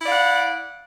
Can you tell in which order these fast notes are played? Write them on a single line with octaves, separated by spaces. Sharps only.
E4 D5 F5 F#5